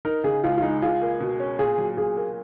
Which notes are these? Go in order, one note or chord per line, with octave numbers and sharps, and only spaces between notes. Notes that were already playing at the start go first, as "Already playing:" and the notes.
D#4 A#4
C#3 G#4
C#2 F4
F4
G#3 D#4
F4 G#4
A#3
B2
C#4
A#2 G#4
F#3
A#2 G#4
A#3